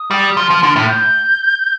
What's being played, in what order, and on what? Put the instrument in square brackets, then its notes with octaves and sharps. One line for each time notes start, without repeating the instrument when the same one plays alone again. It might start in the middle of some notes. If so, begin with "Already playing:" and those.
Already playing: [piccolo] D#6
[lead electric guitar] G3
[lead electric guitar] F3 [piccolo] F6
[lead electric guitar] F3 [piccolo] F6
[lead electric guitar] D3
[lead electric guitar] A2 [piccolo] F6
[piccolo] G6